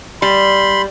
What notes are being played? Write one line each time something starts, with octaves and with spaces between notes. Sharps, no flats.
G3 B5 C6